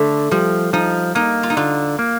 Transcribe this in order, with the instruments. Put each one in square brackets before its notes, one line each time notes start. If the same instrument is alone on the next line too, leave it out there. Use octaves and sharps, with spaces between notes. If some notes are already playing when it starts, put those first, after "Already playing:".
Already playing: [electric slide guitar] D3 [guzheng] A3
[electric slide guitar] F3 [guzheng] G3
[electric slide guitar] F3 [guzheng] D#4
[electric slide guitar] A#3 [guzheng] D#4
[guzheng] F4
D#4
[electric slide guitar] D3 [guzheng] F4
[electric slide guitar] A#3